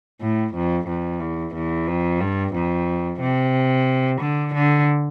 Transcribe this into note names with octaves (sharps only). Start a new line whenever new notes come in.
A2
F2
F2
E2
E2
F2
G2
F2
C3
D3
D3